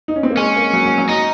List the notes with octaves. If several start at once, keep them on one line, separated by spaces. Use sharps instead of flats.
D#4
C#4
C4
A#3
G#3 C#4
A#3
F#3
F#3
F#3
D#4